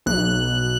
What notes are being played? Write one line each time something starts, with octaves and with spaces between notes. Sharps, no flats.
B1 F#6